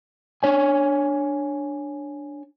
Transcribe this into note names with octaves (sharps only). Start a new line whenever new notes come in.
D4 C#5 G#5